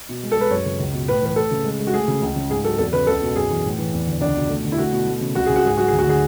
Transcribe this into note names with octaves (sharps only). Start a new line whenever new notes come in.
B2
G#3
A4
G#3 B4
F#2 C#5
C#3
C#2
B2
A2 B4
E3 B4
A3 A4
C#3
G#3
G#3
F#4
A3 G#4
C#3
C#2
C#3
G#2 G#4
F#3 A4
E2 A4
C#3 B4
C#2 A4
B2
F#2 G#4
E3
A2
E3
E2
D3
C#2 D4
B2
A3
D3
E4
A3 F#4
B2
A3
C#3
C#2 F#4
C#3 G#4
F#4
G#2 G#4
F#3 F#4
D2 G#4
F#4
D3 G#4